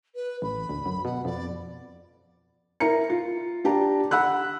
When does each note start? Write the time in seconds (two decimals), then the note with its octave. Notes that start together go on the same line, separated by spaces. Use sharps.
0.15 B4
0.42 A1 B5
0.69 D2
0.86 F#2
1.05 B2 F#5
1.25 F2 D5
2.80 E4 A#4 A#5 C#7
3.10 F4
3.64 D4 G4 A5 A#5
4.11 F#5 B5 E6 F#6